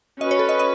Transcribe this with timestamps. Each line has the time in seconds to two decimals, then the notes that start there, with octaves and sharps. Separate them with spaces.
0.21 C#4 F#4 B4 D#5
0.31 C#5
0.39 A4
0.49 D#5
0.59 D#5